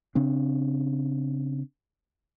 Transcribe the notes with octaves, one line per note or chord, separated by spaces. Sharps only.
C#3 C4 D4